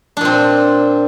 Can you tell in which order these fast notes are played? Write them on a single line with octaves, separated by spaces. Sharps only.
D4 A#2 C4